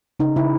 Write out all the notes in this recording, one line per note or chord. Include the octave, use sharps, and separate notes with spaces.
C#3 D#4
C#3 E4